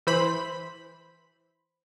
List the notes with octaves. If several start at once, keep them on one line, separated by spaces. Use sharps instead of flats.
E3 C5 B5